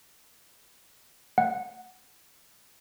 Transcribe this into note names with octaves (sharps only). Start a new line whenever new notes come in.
F#5